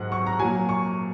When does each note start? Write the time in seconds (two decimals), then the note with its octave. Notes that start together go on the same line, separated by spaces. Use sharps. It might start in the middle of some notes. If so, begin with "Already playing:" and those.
Already playing: G#2 D#3 F#3 F#5
0.12 C#6
0.26 A#5
0.40 A#2 F#3 G#5
0.69 C#6